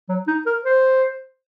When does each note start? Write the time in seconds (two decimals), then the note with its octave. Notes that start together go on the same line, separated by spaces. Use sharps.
0.09 F#3
0.27 D#4
0.46 A#4
0.65 C5